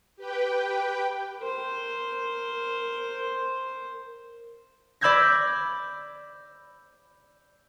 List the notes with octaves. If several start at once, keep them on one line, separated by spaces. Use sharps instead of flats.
G4 B4 G5
A#4 C5
D5 B5 E6 G6 G#6 A#6